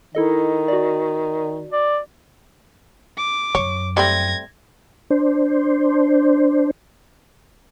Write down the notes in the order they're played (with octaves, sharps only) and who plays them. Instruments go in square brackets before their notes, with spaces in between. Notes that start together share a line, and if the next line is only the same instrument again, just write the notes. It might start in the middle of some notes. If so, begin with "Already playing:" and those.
[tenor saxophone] D#3 [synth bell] E4 A4 D#5
[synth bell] F#4 D5
[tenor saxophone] D5
[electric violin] D6
[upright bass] F#2 [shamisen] C#5
[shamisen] G3 A3 C4 [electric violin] G#6 A#6
[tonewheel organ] D4 C5